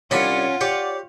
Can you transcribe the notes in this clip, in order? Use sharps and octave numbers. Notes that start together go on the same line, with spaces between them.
C2 C#4 D4 F4 F#5 B5
G4 C#5 D5